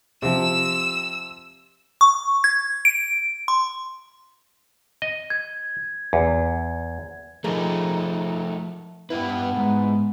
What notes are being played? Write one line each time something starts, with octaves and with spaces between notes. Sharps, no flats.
C3 F3 E6
C#6
G#6
D7
C6
D#5
G#6
E2
F3 A3 D#4 G#4 A#4
G2 B3 E4 G4 B4
G#2 G#3